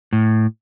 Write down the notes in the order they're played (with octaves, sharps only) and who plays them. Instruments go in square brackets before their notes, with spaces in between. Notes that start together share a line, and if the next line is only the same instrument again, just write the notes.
[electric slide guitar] A2